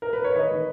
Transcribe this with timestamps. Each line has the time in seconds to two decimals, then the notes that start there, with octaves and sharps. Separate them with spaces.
0.02 A#4
0.13 B4
0.24 C#5
0.35 D#3 B4 D#5
0.51 D#3